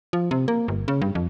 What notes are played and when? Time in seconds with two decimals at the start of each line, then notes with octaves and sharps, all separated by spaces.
0.13 F3
0.31 C3
0.48 A#3
0.68 G1
0.88 C#3
1.02 G2
1.15 F2